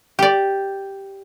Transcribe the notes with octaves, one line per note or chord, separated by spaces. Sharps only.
G4 D5